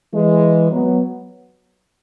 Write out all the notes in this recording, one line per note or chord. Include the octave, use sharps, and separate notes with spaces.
E3 G#3
F#3 B3